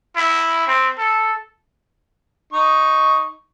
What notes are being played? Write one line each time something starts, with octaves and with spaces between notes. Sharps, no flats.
E4
C4
A4
D#4 C#6